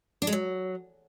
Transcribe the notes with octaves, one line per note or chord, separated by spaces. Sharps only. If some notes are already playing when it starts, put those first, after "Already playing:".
D4
G#3
F#3